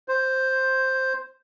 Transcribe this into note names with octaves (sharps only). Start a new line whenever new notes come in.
C5